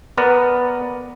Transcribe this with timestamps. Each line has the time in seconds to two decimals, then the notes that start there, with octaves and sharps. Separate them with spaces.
0.18 B3 A#4 B4 D5